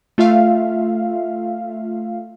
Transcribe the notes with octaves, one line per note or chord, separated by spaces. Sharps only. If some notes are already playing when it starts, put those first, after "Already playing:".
A3 F4 E5 F5